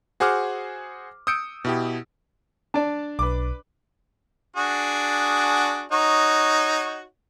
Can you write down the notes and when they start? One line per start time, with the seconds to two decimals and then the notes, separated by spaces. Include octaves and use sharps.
0.20 F#4 G#4 C5 F#5 D6 F6
1.27 D#6 E6 G6 C#7 D7
1.65 B2 E4 G4
2.74 D4 D5 A5
3.19 B1 B4 D6
4.56 D4 F#4 G#4
5.92 D#4 F#4 C#5